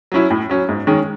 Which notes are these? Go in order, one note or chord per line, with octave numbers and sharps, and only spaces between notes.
F#3 C#4 E4
A2
F#3 C#4
G#2
D#3 G#3 C#4